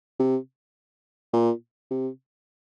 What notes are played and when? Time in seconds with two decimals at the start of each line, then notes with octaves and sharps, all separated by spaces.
0.19 C3
1.33 A#2
1.91 C3